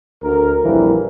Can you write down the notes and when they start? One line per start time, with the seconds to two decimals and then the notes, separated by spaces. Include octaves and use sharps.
0.22 D2 A#4
0.64 A#1 F2 E3 F3 G3